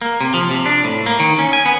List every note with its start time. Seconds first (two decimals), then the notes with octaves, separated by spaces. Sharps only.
0.02 A#3
0.21 C3
0.34 F3
0.51 C3
0.66 D4
0.84 A2
1.06 A#3
1.20 D#3
1.39 C#4
1.53 G#5
1.66 B3